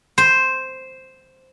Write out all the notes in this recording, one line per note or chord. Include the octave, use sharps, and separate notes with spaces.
C5